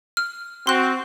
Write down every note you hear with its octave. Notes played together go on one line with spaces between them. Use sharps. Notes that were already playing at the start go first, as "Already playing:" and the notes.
F6
C4 F#4 C6 F#6